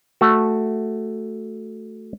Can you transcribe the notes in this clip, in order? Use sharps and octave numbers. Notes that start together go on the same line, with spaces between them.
A3 F#4